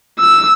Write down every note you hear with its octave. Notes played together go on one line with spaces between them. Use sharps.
E6